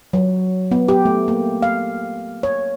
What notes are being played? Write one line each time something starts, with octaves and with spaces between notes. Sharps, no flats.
F#3
B3
G4
A3
A#3
F5
C#5